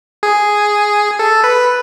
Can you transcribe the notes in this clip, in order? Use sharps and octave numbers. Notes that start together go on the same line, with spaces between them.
G#4
A4
B4